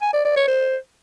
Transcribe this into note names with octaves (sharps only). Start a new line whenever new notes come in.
G#5
D5
D5
C#5
C5